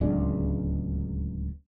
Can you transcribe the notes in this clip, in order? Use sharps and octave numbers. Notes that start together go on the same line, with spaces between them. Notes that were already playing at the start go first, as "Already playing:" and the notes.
D1 C#2 G#3 D4